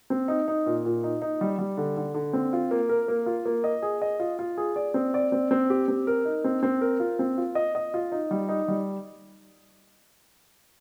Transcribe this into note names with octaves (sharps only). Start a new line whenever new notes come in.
C4
D#4
D#4
A#2
A#2
D#4
D#4
G3
G3
D3
D3
D3
C4
F4
A#3
A#4
A#3
F4
A#3
D#5
G#4
D#5
F4
F4
G#4
D5
C4
D5
C4
C4
G4
C4
A#4
D#4
C4
C4
A#4
F4
C4
F4
D#5
D#5
F4
D#4
G3
D#4
G3